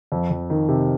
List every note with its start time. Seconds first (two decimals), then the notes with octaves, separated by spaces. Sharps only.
0.12 F2
0.30 F2
0.50 D#3
0.68 C3